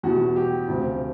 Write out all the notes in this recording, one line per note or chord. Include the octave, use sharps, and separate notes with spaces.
E2 B2 G3 F#4
G4
D2 C3 F3